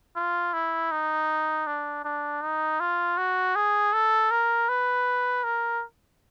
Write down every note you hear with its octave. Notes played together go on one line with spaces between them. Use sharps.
F4
E4
D#4
D4
D4
D#4
F4
F#4
G#4
A4
A#4
B4
A#4